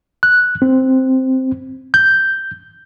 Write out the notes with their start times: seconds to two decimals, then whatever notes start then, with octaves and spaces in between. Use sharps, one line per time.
0.23 F#6
0.62 C4
1.94 G6